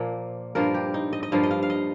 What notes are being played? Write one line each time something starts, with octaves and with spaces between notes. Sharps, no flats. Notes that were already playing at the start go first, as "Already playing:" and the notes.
Already playing: A#2 F3 A#3
G2 F3 A#3 A#4
G4
D#4
D#5
D#5
G2 F3 A#3 F5
D#5
F5
F5
D#5